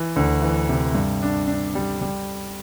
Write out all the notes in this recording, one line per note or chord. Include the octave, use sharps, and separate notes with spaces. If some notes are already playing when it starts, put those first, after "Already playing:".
Already playing: E3
D2
E3
C3
G2
D4
D4
G3
G3